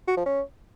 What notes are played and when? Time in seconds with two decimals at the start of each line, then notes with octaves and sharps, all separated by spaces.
0.08 F#4
0.17 F3
0.26 C#4